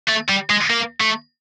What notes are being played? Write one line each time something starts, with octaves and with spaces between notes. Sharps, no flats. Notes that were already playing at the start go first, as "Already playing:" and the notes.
A3
G3
G#3
A#3
A3